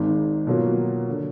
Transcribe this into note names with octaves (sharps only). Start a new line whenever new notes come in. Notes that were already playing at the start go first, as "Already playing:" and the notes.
Already playing: G#1 G#2 D#3
B2 F#3 A#3 F4
D3 F#3